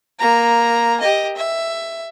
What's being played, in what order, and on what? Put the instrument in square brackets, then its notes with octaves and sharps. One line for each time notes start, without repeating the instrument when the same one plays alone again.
[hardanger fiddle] A#3 A#5
G4 D#5
E5